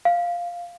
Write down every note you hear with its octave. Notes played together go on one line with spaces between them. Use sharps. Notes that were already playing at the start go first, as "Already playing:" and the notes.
F5